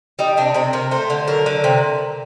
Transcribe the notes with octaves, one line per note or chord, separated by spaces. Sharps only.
G3 D#4
C3 D4
C3 C4
C3 A#4
A3 C5
D3
F#3 A#4
D3
C3